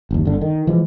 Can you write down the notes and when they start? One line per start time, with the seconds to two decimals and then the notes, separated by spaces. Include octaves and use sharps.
0.11 F#1 D#2
0.25 G1 D3
0.41 D#3
0.67 E3 F3 G#3